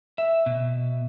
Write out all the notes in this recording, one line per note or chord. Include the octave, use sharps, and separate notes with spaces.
E5
B2